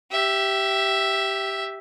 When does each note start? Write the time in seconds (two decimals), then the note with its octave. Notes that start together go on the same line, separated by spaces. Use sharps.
0.11 G4 E5